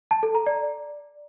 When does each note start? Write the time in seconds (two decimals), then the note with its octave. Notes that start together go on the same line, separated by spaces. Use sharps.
0.11 A5
0.23 A4
0.35 A#5
0.47 D5